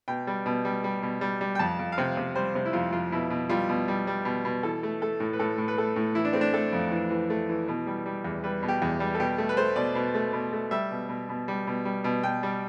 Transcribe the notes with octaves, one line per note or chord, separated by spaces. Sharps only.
B2 G5
G3
B2
G3
G3
B2
G3
G3
G5
F2 A5
F2
F5
C3 G5
C3
G3 C5
C3
E4
F2 F4
F2 F4
B2 E4
B2
G3 F4
B2
G3
G3
B2
B2
E3 A4
A3
A3 A4
A2
B4
A2 A4
A2
B4
A3 A4
A2
E3 E4
D4
A3 C4
D4
A3 A4
F2
E3
E3
A3
E3
B2
G3
G3
E2
G3 B4
B2
G4
E2
G3
A4
B2 G4
A3
B4
A3 C5
B2 D5
B2
A3
B2
A3
G3 E5
B2
B2
B2
G3
B2
G3
B2
B2 G5
G3